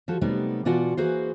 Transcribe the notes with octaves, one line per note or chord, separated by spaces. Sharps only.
F3 F#4 A4
C3 F#3 G3 A3 B3 D#4
B2 E3 F4 F#4 D5 F#5
E3 A#3 F#4 G#4 B4 C5